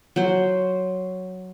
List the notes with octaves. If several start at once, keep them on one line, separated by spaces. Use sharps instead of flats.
F#3 C5